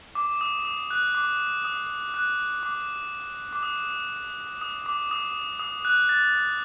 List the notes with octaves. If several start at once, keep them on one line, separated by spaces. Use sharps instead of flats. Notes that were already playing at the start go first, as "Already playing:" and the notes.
D6
D#6
D#6
F#6
D6
D#6
F#6
D6
D6
D#6
D#6
D6
D#6
D#6
F#6
A6